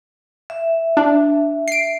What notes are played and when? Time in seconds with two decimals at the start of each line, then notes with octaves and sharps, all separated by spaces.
0.50 E5
0.97 D4
1.68 C7 D7